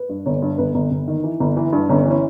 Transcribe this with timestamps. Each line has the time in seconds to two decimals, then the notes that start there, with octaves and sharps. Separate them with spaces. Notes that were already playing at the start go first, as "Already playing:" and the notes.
Already playing: B4
0.09 G2
0.26 G1 C#5
0.42 G2
0.58 G1 B4
0.74 G1
0.91 G1
1.08 D#3
1.24 E3
1.40 G1
1.57 E3
1.73 G2
1.89 G1 C#4
2.06 E3 C#4